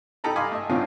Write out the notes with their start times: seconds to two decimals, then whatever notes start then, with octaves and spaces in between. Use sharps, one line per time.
0.24 D#4 G4 A4 A#5 B5
0.36 D#5 F5 G#5 B5 C6 D6
0.51 A3 D#5 E5
0.69 A2 D3 C4 C#4 D#4 F4